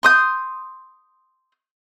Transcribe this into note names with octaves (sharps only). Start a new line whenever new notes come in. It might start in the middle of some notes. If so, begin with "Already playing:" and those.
C6 D#6 G6